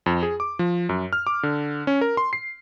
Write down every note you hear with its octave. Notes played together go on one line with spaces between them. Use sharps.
F2
G#4
D6
F3
F#2
F6
D6
D3
C#4
A#4
C6
C7